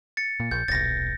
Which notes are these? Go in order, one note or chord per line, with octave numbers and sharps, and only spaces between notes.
A6 C#7
A#2
A#1 G6
D#1 B1 A6 A#6